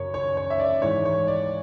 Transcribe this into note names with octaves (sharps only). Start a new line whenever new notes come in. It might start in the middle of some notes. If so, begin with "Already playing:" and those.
Already playing: F#2 C#3 C#5
C#5
C#5
E5
D5
G#2 E3 C#5
C#5
D5